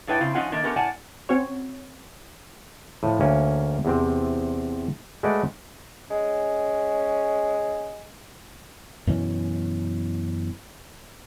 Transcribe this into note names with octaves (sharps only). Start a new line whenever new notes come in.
G#2 D4 E4 B4 C#5 G5
C#3 C4 E4 F4
F3 C#4 D#4 F4 F#5
D#3 A3 A#3 D4
A3 B3 C#4 G4 A#4
F#2 A2 D5 F#5 G#5 A5
C4 C#4 F#4 C#5
A2 F3
D2 A#3 C#4
E2 C3 C4
G#3 A3 F#4 A4 B4 D5
G#3 C#4
F#2 B2 E3 C#4